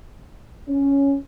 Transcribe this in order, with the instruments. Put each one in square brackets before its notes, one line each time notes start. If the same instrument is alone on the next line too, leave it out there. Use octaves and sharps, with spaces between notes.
[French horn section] C#4